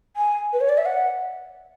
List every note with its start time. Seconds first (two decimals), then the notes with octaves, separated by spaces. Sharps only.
0.17 G#5
0.53 B4
0.61 C#5
0.69 D5
0.78 E5
0.86 F#5